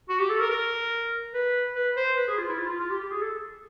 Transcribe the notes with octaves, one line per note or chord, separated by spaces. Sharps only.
F#4
G4
A4
A#4
A#4
B4
B4
C5
B4
G#4
F4
E4
F4
F4
F4
G4
G4
G#4
A4